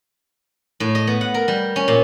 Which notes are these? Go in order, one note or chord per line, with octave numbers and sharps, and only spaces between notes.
A2
D#5
B3
F#5
A#4
G3
C#4
A#2